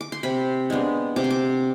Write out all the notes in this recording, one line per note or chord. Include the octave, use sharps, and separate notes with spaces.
D6
C6
C3 B5
G#3 B3 D4
C3 D6
C6
D6